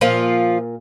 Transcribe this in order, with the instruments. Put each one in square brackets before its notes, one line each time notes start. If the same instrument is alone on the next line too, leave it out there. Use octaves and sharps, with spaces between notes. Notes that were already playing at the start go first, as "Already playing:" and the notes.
[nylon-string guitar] A#2 A#3 [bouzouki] F3 F4